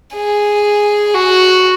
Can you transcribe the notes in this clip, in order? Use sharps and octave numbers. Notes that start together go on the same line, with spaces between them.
G#4
F#4